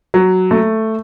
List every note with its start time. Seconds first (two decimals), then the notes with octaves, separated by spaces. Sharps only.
0.14 F#3
0.51 A3